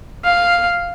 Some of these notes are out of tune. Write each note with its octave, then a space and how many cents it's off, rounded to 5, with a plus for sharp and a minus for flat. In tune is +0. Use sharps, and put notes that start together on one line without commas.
F5 +0